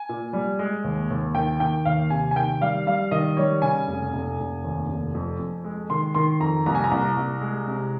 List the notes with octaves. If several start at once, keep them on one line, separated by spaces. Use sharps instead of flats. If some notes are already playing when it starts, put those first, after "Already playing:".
Already playing: G#5
A#2
G3
G#3
D#2
D#2
D#3 G5
D#3 G5
D#2 F5
C3 G#5
G#5
D#3 G5
G3 F5
G3 F5
D#3 D#5
G3 C#5
C#3 G#5
F1
F1
F1
D#2
F1
F2
F2
G#3
D#3 C6
D#3 C6
F2 A#5
C2 A#5
G#5
A#5
C2
C2
G#3
C3